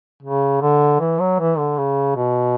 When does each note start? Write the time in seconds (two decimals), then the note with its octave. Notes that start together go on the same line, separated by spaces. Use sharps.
0.23 C#3
0.62 D3
1.00 E3
1.20 F#3
1.39 E3
1.58 D3
1.78 C#3
2.16 B2